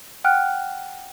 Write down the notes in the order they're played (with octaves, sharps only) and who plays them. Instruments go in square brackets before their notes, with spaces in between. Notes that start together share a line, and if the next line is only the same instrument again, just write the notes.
[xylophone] F#5 G5 F6 F#6